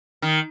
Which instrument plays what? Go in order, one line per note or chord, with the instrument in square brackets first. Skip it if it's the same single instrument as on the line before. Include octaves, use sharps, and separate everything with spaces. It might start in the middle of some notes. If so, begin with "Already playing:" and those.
[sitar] D#3